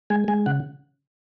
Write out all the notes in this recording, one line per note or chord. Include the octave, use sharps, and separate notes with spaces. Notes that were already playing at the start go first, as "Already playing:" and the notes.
G#3 G#5
G#3 G#5
C#3 F#5